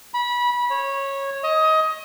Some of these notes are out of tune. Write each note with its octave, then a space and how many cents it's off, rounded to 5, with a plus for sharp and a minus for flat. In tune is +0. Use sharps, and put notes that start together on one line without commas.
B5 -25
C#5 -15
D#5 +20